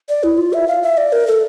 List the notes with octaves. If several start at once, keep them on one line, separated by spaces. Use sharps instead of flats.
D5
E4
F4
E5
F5
E5
D5
A#4
A4